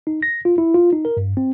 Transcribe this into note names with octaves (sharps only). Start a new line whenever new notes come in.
D#4
A#6
F4
E4
F4
D#4
A#4
G2
C4